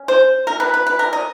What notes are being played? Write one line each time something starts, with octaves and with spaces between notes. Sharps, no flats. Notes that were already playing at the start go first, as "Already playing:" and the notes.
Already playing: C#4
C5
A#4
B4
B4
B4
A#4
D#5